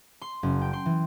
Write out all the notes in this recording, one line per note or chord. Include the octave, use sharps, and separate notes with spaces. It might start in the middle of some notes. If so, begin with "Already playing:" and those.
C6
F#1
G5
C6
E3